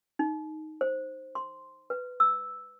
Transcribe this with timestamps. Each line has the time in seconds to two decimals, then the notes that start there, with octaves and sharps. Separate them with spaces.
0.19 D#4
0.81 C5
1.35 C6
1.90 B4
2.20 E6